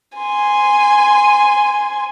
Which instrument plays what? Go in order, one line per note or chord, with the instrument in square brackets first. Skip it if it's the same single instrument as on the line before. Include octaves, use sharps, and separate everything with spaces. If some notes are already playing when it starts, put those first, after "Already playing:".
[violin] G#5 C6